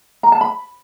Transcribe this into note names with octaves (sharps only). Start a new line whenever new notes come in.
A#5
A5
B5